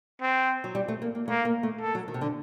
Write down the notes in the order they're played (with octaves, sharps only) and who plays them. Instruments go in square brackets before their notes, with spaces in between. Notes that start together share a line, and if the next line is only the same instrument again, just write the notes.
[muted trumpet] C4
[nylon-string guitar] F#3
G3
A3
A#3
A#3
[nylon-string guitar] A3 [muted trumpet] A#3
[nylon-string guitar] A#3
A3
[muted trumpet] A4
[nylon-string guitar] F#3
D#3
C3
D3